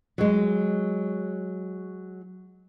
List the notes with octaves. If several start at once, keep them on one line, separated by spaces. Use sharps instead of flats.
F#3 G#3